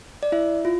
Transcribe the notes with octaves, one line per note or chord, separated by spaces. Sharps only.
D5
E4 E5
F4